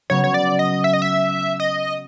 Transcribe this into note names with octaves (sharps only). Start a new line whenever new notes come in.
C#3 F#3 B3 C#5
C#5
D5
D#5
E5
D#5
E5
D#5